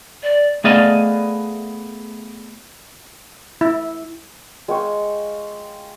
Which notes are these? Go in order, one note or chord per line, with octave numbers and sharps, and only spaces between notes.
D5
A3 B3 G#4 D5 D#5 F5
E4
G#3 F5 G5 C#6